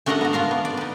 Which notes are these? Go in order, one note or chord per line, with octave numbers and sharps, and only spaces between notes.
A3 D4 F#4 A#4 D#5 F#5
B3 F#4
D4 F4 A#4 F5
B3
D5
D#4 B4